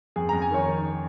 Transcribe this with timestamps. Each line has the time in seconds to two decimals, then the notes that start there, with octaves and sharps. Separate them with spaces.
0.16 F2 G#4
0.29 A#5
0.33 F2
0.42 G#5
0.51 D#3 C#5
0.67 D#3